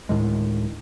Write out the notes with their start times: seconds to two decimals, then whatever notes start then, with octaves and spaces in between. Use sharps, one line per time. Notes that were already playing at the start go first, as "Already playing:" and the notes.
0.09 D2 A2 D#3 G#3